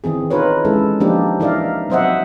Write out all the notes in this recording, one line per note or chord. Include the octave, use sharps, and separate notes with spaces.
D#3 E3 C4 G#4
D#4 F4 A#4 B4 C#5
E3 G#3 C#4 E4 A4
F3 A#3 D4 D#4 G4
E3 D#4 A#4 D5 E5 F5
F#3 C4 C5 D#5 E5 F#5